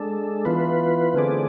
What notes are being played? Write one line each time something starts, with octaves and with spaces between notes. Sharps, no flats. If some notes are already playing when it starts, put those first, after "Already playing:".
Already playing: G#3 D4 A4
E3 B3 F4 B4
D3 A3 C4 G#4 D5